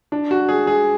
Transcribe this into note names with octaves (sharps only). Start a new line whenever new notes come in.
D4
F#4
G#4
G#4